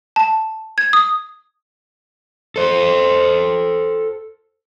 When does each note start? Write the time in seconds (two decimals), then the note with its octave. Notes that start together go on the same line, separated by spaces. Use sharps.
0.16 A5
0.78 G#6
0.93 D#6
2.56 A4 C5